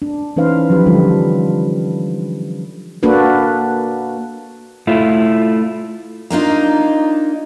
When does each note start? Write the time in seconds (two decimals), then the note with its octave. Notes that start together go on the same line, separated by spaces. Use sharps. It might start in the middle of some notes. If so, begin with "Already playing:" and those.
0.02 D4
0.36 E3 C#4 D#4 B4 C5 F5
0.70 F3 F#3 G4 B4
0.86 D3 F3 G3 D4 F4 A4
3.03 A#3 D4 F#4 A4 B4
4.87 A3 E4 F4
6.30 A#3 D4 D#4 F4